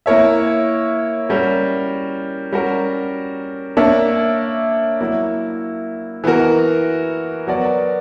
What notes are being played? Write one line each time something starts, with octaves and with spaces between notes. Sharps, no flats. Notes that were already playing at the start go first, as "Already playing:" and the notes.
A#3 E4 A#4 C#5 E5
G3 C#4 F#4 A#4
G3 C#4 F#4 A#4
A#3 D4 A#4 C#5 E5
F#3 A#3 E4
E3 B3 F#4 A#4
F#3 B3 F#4 A#4 D5